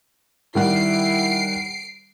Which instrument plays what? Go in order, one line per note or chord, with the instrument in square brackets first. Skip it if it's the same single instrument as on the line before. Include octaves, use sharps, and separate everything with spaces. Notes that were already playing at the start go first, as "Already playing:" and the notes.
[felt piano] D#3 G3 F#5 [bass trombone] E4 [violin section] C7 D7